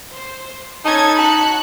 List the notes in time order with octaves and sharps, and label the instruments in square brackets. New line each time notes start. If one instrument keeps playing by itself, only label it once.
[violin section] C5
[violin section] C#4 A4 G#6 [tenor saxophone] D#4 [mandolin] A5
[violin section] F#4 F#6 [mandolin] A5 B5